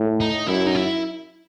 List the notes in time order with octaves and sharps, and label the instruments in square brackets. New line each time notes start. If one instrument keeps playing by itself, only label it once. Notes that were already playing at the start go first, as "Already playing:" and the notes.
Already playing: [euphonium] A2
[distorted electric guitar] D#4
[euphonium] F#2 [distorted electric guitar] E4
[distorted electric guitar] D#4
E4